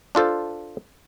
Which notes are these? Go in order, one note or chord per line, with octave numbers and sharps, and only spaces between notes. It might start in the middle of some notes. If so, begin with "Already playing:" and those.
D4 F4 A4 C5